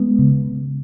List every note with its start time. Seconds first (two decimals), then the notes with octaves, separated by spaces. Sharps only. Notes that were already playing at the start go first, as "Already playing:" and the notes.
Already playing: G#3 B3
0.19 C#3